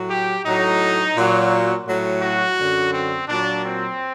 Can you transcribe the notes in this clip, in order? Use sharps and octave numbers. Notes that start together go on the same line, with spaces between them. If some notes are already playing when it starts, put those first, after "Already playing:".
Already playing: A2 F#3
G4
A2 F#3 D#4
A#2 F#3
A2 F#3
F#4
F#2 D3 F#3
C4
A#2 F#3 D4
C4